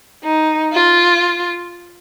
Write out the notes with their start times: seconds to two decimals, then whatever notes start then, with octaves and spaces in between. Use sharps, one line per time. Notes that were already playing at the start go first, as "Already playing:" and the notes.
0.24 D#4
0.73 F4